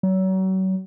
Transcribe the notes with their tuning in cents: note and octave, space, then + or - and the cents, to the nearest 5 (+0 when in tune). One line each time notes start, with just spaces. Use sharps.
F#3 +35